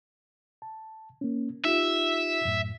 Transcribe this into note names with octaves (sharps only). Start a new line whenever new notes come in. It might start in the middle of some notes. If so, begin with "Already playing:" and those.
A5
A#3 C#4
D#4 F4 G4 E5
F#2 A2